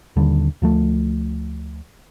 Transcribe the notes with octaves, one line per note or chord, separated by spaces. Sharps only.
D#1 D#2 D3 G3
D2 F3 A3